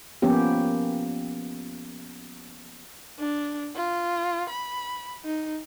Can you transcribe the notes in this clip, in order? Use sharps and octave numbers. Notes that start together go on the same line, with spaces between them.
F3 A#3 B3 C#4 G4
D4
F4
B5
D#4